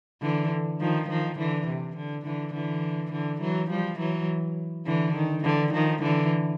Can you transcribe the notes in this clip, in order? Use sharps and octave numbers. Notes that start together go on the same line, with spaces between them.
D3 E3
D#3 F3
D#3 F3
D3 E3
C3
D3
D3 E3
D3 E3
D3 E3
E3 F#3
F3 G3
E3 F#3
D3 E3
D#3
D3 E3
D#3 F3
D3 E3